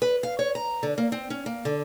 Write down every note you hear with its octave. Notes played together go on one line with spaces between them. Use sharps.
B4
F5
C#5
A#5
D3
A#3
C4
C#4
A#3
D3